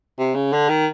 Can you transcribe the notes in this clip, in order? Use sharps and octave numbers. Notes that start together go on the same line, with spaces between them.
C3
C#3
D3
D#3